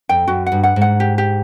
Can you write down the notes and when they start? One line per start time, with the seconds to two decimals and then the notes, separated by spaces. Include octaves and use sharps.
0.09 F2 G5
0.28 F#2 F#4
0.47 F#5
0.52 G2
0.64 F#5
0.76 G#2
0.82 F#5
1.00 G4
1.18 G4